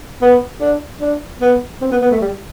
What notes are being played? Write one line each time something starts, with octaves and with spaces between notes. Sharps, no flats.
B3
D4
D4
B3
C4
B3
B3
A3
G3